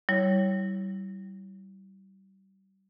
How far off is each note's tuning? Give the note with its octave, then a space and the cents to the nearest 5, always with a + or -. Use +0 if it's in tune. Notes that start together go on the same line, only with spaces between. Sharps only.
G3 -30 E4 +0 C#5 +0